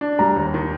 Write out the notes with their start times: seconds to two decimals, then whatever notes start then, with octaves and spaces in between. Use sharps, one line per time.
0.01 D4
0.19 G3 A#5
0.36 D#2
0.54 D#3